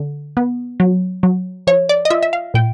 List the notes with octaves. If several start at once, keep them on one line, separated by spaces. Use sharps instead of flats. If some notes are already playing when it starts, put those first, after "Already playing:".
Already playing: D3
B3
F#3
F#3
F3 C#5
D5
D#5
F4 E5
E5
F5
A#2 G5